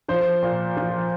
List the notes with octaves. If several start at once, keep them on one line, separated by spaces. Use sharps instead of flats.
F3 C5
A#2
F3